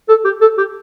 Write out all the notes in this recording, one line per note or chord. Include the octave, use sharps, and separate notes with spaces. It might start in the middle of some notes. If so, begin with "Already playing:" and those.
A4
G4
A4
G4